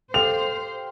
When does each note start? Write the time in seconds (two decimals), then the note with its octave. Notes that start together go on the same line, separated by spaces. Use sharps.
0.14 G4 A4 C5 F5 F7